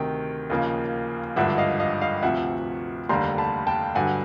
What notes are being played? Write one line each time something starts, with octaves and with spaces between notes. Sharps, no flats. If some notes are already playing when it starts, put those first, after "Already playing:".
Already playing: D2 C3 D#3 G5
D#2 C#3 F3 A#3
G#1 G2 D3 F3 E5 F#5
D#5 F5
D#5 F5
D#5 F5
D2 C3 F3 E5 F#5
F1 D#2 D3 G3 A#5 C6
A5 B5
G5 A5
G2 D3 F#3 F#5 G#5